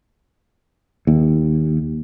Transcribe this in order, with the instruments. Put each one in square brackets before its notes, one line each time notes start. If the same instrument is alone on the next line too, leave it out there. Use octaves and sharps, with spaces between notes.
[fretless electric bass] D#2